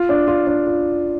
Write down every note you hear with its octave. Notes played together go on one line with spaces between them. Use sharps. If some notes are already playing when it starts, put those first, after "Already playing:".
Already playing: F4
D4
F4
D4
F4